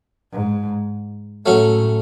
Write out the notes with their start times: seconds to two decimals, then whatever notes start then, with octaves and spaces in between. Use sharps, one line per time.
0.33 G#2
1.45 A2 F#3 A3 C#4 F#4